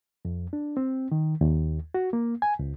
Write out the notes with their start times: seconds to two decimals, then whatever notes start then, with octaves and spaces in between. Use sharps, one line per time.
0.25 F2
0.53 D4
0.77 C4
1.12 D#3
1.41 D#2
1.94 F#4
2.13 A#3
2.42 G#5
2.59 C#2